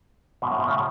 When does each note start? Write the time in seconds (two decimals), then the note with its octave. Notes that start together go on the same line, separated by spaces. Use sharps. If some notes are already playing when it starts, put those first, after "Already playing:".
0.42 G#2 B2
0.51 F#2 A2
0.58 G#2 B2
0.67 A2 C#3